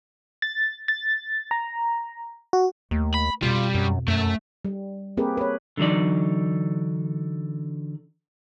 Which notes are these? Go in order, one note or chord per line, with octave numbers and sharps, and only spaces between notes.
A6
A6
A#5
F#4
D#2 A3
B5
F2 B2 G3 F4
F#2
F#2 A3 E5
G3
A#3 C4 G4 G#4 A#4 B4
B4 C#5
D3 E3 F#3 D#4 D5